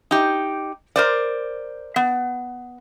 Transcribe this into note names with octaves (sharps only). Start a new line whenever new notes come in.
D#4 G4
A#4 C5 D5
B3